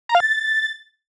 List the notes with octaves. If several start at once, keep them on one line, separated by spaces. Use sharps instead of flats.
A#5
F5
A6